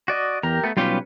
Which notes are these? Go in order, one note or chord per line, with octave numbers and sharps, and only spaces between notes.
F#4 D5 D#5
E2 G4 A#4 A#5
A3 B3
B1 G3 C#4 F4 G4 B4